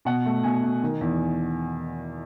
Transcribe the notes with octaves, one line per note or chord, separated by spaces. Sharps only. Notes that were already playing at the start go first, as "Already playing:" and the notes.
B2 F#5
A3
B2 G#5
B2
D#3
E2